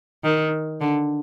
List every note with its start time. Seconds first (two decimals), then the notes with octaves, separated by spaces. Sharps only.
0.24 D#3
0.81 D3